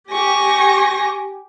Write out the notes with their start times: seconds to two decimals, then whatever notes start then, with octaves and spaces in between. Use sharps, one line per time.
0.12 G4 G#5 C#6 A#6